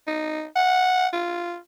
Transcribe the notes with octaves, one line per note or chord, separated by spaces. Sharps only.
D#4
F#5
F4